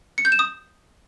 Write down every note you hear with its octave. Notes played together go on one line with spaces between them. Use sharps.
C#7
G6
E7
D#6